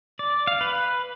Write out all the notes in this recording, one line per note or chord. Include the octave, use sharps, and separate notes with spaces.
D5
F5
B4